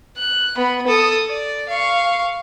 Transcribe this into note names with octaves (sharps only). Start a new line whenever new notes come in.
F#6
B3 B5
A4 D#6
D5
F5 C#6